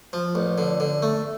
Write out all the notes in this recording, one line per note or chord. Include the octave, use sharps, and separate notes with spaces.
F3
A1
D3
D3
A3